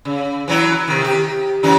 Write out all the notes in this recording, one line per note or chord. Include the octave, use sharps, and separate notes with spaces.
C#3
E3 F#3 E4
C3 D#3
G4
F#2 E3 D#4